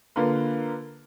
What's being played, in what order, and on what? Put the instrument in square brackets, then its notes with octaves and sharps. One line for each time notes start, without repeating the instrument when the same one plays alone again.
[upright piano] D3 A#3 F4 B4